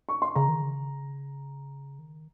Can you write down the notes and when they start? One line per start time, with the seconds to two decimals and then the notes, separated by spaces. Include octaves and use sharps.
0.09 C#6
0.22 C6
0.35 C#3 A#5
0.49 D#3
0.62 C#3
1.99 D#3